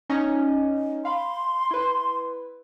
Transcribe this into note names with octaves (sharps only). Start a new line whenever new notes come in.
C#4 D#4 D#5
F5 B5 C6
E4 B4